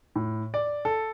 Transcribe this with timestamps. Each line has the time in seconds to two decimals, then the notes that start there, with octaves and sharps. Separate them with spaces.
0.16 A2
0.54 D5
0.85 A4